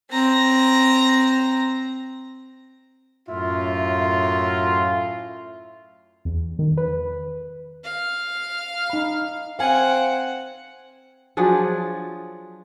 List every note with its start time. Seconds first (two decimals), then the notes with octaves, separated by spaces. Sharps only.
0.11 C4 A#5
3.29 F#2 A2 E4 F4
6.25 E2
6.59 D#3
6.77 B4
7.85 F5
8.90 D#4 B5
9.59 C4 F5 F#5 G#5
11.37 F3 F#3 D4 G#4